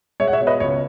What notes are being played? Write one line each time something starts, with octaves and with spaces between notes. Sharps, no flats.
G#3 C#5 E5
F#5
C#5 E5
B2
B4 D#5
C#2 C#5